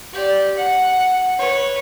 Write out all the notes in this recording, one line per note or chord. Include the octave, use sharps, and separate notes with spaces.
G4 D5
F#5
B4 C#5